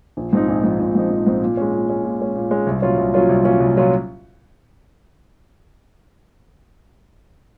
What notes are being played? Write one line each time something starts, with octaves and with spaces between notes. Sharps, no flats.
A#1
G#2 F3 C4 D#4
A#1
G#2 F3 C4 D#4
A#1
G#2 F3 C4 D#4
A#1
G#2 F3 C4 D#4
A#2
G#3 C#4
A#2
G#3 C#4
A#2
G#3 C#4
A#2
G#3 C#4
C2
A#2 F#3 C#4 F4
C2
A#2 F#3 C#4 F4
C2
A#2 F#3 C#4 F4
C2
A#2 F#3 C#4 F4